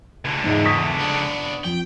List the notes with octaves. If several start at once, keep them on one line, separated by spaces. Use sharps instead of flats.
C#2 D3
E2 G#2
C#6 D#6 B6
B3 D4
F2 G5